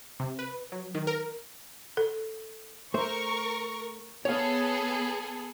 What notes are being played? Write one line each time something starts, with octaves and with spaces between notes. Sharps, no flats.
C3
B4
F#3
D#3
A#4
A4
A3 A#4 C5 C#6
B3 G#4 A4 C#5 F5